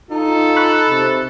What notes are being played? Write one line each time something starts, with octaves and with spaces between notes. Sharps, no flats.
D#4 F4 A4
B5 C#6 F#6
C3